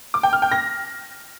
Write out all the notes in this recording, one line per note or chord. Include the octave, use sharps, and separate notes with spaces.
D6
G5
F6
G5
A#6